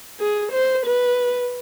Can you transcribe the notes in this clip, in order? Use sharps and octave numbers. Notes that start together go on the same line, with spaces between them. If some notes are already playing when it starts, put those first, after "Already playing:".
G#4
C5
B4